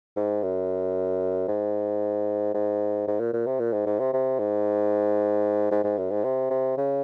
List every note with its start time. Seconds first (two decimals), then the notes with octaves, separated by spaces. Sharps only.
0.17 G#2
0.43 F#2
1.48 G#2
2.54 G#2
3.08 G#2
3.20 A#2
3.33 A#2
3.47 C3
3.59 A#2
3.73 G#2
3.86 G#2
3.99 C3
4.13 C3
4.39 G#2
5.71 G#2
5.84 G#2
5.98 F#2
6.11 G#2
6.24 C3
6.50 C3
6.77 C#3